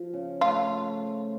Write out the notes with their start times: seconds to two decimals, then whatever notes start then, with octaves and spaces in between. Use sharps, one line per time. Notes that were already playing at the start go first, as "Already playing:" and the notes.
Already playing: F3
0.14 C#3
0.41 A3 F4